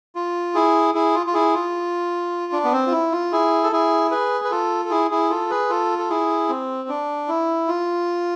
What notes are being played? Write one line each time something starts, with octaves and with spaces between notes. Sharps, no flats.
F4
E4 G#4
E4 G#4
F4
F4
E4 G#4
F4
D4
B3
C4
F4
E4
F4
E4 G#4
A4
E4 G#4
G#4 B4
B4
F4 A4
A4
E4 G#4
E4 G#4
F4 A4
G#4 B4
F4 A4
A4
E4 G#4
C4
D4
E4
F4